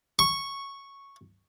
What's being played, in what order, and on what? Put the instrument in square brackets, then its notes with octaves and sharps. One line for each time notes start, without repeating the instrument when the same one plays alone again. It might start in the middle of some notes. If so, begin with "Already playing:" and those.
[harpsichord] C#6